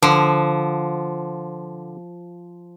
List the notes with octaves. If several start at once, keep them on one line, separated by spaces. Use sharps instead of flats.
D3 F3